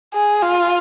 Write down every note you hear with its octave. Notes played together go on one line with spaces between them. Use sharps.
G#4
F4